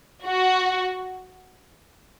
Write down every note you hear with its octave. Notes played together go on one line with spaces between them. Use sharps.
F#4